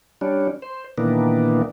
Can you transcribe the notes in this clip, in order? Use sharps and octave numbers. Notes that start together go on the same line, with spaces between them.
G3 C#4 D4
C5
A#2 D#3 E3 A#3 B3 D4